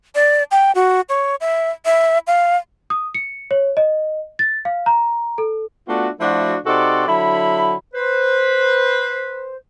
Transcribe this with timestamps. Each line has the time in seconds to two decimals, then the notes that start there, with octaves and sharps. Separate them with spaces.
0.15 D5
0.51 G5
0.75 F#4
1.09 C#5
1.41 E5
1.85 E5
2.27 F5
2.90 D#6
3.15 C#7
3.51 C#5
3.77 D#5
4.39 A6
4.65 F5
4.86 A#5
5.38 A4
5.88 A3 B3 D4 F4 F#4
6.20 F3 A3 D4 E4 F#4
6.66 C3 D#4 F#4 A4 D5 C6
7.07 D3 F#3 E4 B5
7.93 B4 C5